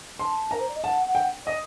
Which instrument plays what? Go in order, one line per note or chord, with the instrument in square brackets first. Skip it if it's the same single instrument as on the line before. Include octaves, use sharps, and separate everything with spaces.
[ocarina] A5 [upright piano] C6
[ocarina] A#4 [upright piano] A#5
[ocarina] C5
D5
D#5
[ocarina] F#5 [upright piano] A5
[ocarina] F#5
[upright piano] G5
[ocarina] D5 [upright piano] D#5